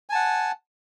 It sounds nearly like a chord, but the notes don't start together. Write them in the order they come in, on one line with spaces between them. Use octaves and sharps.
G#5 A5 F#5